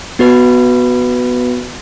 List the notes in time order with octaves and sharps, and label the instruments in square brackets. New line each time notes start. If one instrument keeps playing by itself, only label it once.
[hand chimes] B3 F#4 B4